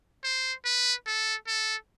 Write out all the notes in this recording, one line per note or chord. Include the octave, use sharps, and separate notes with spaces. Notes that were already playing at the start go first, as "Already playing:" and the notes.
C5
B4
A4
A4